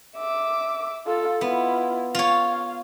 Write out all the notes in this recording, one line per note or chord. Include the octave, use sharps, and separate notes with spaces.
E5 D6
F4 A4
B3 E4 F4
F4 C#5 F5